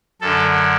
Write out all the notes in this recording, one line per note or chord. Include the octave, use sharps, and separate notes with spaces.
F#2 D3 A4